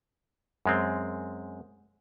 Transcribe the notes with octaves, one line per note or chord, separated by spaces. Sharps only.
F#2 G#3 C4